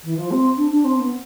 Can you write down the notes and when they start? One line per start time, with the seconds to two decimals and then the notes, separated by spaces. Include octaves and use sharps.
0.03 E3
0.16 F3
0.31 C4
0.57 D4
0.71 D4
0.84 C4
0.98 B3